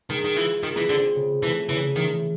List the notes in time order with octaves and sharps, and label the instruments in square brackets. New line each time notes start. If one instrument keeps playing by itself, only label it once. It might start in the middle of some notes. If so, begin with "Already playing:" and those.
[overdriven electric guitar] D#3 [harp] G#3
[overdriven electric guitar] D#3
[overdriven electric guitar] E3 [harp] F4
[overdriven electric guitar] D#3 [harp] G#4
[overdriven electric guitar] E3
[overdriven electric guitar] D3 [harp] C4
[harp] C#3
[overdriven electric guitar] E3 [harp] A3
[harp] C#3 [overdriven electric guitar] E3
[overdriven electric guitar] D#3 [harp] E3